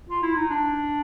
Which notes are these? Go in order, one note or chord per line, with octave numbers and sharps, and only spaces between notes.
F4
E4
D#4
D4